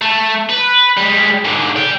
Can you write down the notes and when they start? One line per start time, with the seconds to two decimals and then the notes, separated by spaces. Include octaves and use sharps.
0.01 A3
0.50 B4
0.97 G3 G#3
1.45 G#2 D3
1.76 D5 G5